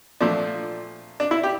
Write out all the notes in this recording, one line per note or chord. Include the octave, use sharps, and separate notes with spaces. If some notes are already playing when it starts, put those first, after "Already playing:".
A#2 F3 A3 D4
D4
E4
G4